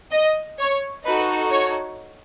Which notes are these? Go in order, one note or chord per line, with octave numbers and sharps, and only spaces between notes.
D#5
C#5
D#4 F#4 A4 B4
C#5